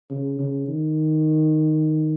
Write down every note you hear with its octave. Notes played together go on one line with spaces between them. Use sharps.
C#3
C#3
D#3